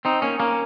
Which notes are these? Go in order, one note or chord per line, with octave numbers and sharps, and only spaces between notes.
C4 D#4
A#3 C#4
A#3 C#4